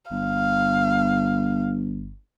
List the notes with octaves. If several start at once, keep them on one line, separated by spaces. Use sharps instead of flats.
G1 F5